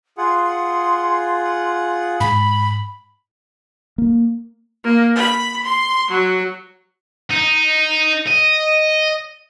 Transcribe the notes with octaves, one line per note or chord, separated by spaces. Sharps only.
F4 G#4 F#5 C6
G#2 B5
A#3
A#3
B5
C6
F#3
D#4
D#5